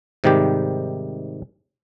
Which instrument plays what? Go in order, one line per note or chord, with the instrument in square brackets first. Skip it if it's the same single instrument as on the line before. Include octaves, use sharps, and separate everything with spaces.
[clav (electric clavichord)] G#2 C3 D#3 G3 G4